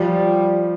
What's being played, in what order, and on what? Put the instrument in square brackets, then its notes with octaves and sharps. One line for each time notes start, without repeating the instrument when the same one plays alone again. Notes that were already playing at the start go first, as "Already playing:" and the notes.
Already playing: [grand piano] F3 [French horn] G3